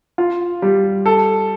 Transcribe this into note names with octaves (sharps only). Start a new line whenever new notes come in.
F4
G3
A4